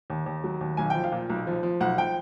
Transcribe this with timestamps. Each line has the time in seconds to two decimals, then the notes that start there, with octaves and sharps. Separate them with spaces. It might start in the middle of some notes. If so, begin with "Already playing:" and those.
0.10 D#2
0.26 D#2
0.44 F#3
0.61 D#2
0.77 B1 G#5
0.90 F3 G5
1.04 F5
1.12 A#2
1.30 B1
1.47 F3
1.63 F3
1.80 B1 F#5
1.97 F3 G5